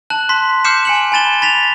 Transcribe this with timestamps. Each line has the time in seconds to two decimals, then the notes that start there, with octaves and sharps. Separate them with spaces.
0.10 A5 F#6 F#7
0.29 C6 B6
0.65 D6 F6 G6 C7 C#7 E7
0.85 G#5 C#7 F#7
1.12 G#5 B5 A6 E7 G7
1.41 B5 A6 B6 F7